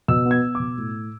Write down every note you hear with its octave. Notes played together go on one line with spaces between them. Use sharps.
B2 E6
B3
G#6
B3
B2 D6
A2